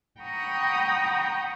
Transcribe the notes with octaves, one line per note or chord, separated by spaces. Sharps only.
F#5 G5 A#5 B5 C#6 D#6